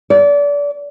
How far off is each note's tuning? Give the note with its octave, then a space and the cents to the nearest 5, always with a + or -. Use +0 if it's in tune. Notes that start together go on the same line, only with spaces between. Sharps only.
D5 -30